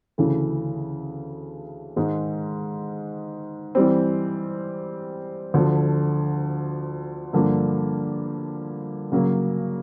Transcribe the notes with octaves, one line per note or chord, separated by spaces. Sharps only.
D2 C#3 E3 A3
G#2 D#3 G#3
E3 G3 C4
D2 D3 F3
G2 D3 F3 A#3
C#3 F#3 A#3